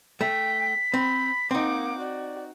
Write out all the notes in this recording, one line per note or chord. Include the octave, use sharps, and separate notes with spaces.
A3 G5 B6
C4 B5
A#3 C4 D#4 F#5 D6
F#4 D5